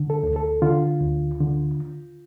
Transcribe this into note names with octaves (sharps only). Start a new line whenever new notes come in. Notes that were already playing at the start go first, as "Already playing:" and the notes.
Already playing: D3
A4
D2
A4
D3 F4
D2
D3